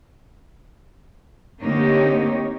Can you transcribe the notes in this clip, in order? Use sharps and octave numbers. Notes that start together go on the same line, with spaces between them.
D3 A#3 C4 D#4 G4 C#5